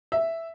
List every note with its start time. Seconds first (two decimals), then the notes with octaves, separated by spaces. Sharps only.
0.12 E5